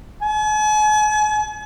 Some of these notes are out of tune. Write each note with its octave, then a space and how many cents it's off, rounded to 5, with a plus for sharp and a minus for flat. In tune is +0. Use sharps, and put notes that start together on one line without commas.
G#5 +40